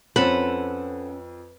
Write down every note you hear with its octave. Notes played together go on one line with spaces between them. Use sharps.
F2 C4 C#4 A4 B4 F#5